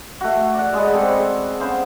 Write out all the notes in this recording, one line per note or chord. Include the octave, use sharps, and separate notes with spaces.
A3 F#4
D5 F#5
G#3 G#4 B4
C4 G#4 A4
B3 C#4 C5 F5